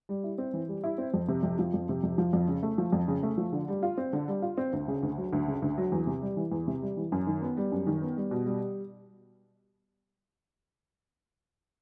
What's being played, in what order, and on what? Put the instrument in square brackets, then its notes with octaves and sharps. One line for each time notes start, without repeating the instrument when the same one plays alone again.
[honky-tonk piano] G3
E4
C4
E3
G3
E4
C4
F2
C3
F2
F3
F2
C3
F2
F3
F2
C#3
A3
F3
F2
C#3
A3
F3
D3
G3
F4
C4
D3
G3
F4
C4
D2
C#3
D2
F#3
D2
C#3
D2
F#3
E2
C3
G3
E3
E2
C3
G3
E3
F#2
D#3
B3
G3
F#2
D#3
B3
G3
B2
G3